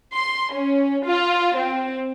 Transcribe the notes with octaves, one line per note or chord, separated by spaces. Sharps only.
C6
C#4
F4
C4